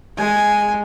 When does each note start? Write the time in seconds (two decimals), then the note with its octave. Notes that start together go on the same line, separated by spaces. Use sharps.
0.18 G#3 G#5